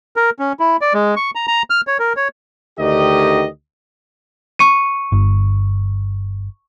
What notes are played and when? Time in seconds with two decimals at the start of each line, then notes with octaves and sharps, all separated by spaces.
0.16 A#4
0.39 C#4
0.60 E4
0.81 D5
0.94 G#3
1.16 C#6
1.35 A#5
1.47 A#5
1.70 F6
1.87 C#5
1.99 A#4
2.16 C#5
2.80 D2 D3 D#3 G4 D#5
4.59 C#6 C#7 D#7
5.12 G1